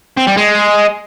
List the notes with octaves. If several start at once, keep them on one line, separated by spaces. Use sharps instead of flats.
C4
G3
G#3